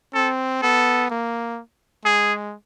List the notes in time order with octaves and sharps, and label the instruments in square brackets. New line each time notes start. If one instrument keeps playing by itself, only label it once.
[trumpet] C4 [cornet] A4
[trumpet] B3 [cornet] A4
[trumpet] A#3
[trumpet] G#3 [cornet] G#4